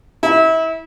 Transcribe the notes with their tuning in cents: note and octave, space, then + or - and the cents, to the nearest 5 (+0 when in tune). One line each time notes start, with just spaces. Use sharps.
E4 -30